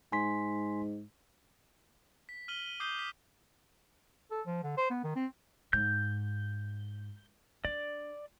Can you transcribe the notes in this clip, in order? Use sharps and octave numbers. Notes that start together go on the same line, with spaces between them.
G#2 G#5 C6 B6
B6
F6 D#7 F#7 G7
D#7
D6 D#6 G6 C7 D#7 G7
B6
A4
F3
D3
C5
B3
D#3
C4
G#2 G6
D4 D5